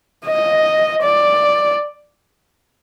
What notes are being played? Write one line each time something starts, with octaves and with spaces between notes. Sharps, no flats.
D#5
D5